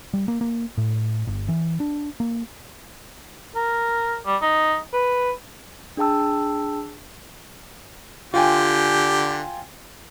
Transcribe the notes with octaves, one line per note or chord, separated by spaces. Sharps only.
G3
A#3
A#3
A2
G1
E3
D4
A#3
A#4
G3
D#4
B4
D4 G#4 G5 A5 E6
D3 F4 G4 G5 G#5